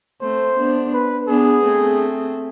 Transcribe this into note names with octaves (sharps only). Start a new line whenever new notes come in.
A3 C4 C5
B3 D4
B4
B3 D4 G#4
A3 C4